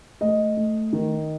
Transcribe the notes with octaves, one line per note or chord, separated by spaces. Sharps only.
A3 D#5
A3
D#3